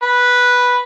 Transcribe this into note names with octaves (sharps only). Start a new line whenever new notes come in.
B4